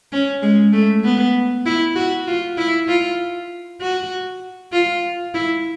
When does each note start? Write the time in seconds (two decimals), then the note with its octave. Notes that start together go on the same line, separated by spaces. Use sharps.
0.12 C#4
0.42 G#3
0.73 A3
1.04 B3
1.66 E4
1.96 F#4
2.27 F4
2.57 E4
2.88 F4
3.80 F#4
4.72 F4
5.34 E4